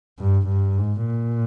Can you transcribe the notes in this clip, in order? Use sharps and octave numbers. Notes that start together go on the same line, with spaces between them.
G2
G2
G#2
A#2